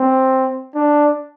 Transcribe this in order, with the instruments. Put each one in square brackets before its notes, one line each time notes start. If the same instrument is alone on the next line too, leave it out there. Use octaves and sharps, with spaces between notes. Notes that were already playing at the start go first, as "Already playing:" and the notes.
Already playing: [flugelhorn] C4
D4